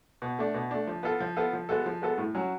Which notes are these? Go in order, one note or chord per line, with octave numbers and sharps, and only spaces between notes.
B2
A3 D4
B2
A3 D4
F3
B3 F4 A4
F3
B3 F4 A4
F3
G#3 B3 F#4 A4
F3
G#3 B3 F#4 A4
A2
F#3 C#4 F#4